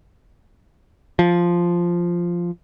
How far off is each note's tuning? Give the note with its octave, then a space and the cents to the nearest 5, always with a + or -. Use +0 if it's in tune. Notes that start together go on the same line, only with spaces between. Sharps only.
F3 -5